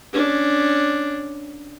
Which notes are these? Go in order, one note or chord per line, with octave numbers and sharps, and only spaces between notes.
C#4 D4